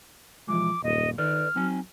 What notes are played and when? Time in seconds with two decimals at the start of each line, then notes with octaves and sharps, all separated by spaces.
0.48 B1 E3 F3 G#3 D6
0.84 D#1 F#2 A#2 D#5
1.18 D#3 A4 B4 D5 F6
1.56 F#3 C4 D#4 G#5